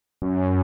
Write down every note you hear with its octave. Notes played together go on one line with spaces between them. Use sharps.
F#2